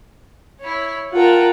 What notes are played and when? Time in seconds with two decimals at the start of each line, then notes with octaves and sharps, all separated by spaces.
0.60 E4 C#5
1.13 F4 A#4 F#5 G5 A5